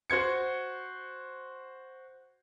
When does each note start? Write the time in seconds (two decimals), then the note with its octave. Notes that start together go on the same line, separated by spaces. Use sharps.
0.10 F#4 C5 G#6 C#7